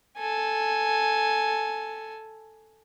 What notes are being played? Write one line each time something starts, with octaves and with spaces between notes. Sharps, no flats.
A4 G#5